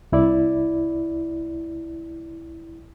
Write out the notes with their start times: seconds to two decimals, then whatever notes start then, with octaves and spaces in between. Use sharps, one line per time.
0.12 C2 E4 D5